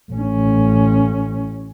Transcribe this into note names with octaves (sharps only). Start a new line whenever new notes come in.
A1 C#4